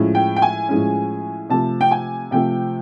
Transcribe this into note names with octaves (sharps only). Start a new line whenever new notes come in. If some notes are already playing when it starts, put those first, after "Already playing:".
Already playing: A2 F3 G#3 C#4
G5
G5
G#5
A2 F3 G#3 C#4
C3 F3 A3 A5
G5
G#5
C3 F3 A3 G5